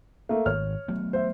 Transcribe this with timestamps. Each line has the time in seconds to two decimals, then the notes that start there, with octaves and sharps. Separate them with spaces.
0.29 A3 A#3
0.46 G#1 C#5 F6
0.88 F#3 A3 B3
1.13 C5 E5